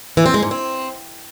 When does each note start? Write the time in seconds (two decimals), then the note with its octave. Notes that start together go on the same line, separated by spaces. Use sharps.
0.17 E3
0.26 C4
0.34 G#3
0.43 G#2
0.51 C4